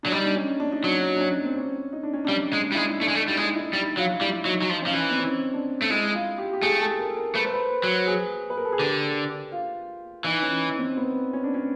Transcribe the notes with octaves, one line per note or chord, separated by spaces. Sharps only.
F#3 D4
G3 D#4
D4
C#4
D4
D#4
F#3 D4
D4
C#4
C4
C#4
D#4
D4
C#4
G3 D4
G#3
G3
G#3 E4
D#4
A3 D4
G#3
A3
D#4
G3 E4
G#3 D#4
E4
G3 D#4
F#3 F4
G3 E4
F#3 D#4
F#3
F3
F3 C#4
E3
C4
C#4
D4
A3
G#3 E4
F4
G4
G4
A3 G#4
A4
A#4
A#4
A3 B4
C5
B4
F#3
G#4
B4
A#4
A4
G#4
D3 G4
F4
E3 D#4
C#4
C4
B3
C#4
D4
C#4